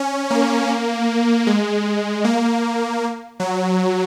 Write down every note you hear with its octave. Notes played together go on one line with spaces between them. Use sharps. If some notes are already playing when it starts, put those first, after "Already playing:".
Already playing: C#4
A#3
G#3
A#3
F#3